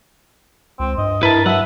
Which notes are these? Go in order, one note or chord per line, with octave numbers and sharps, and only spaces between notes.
C#2 C4
G2 D#5
G2 E4 A#4 B4 A5
F#3 B4 E5 F#5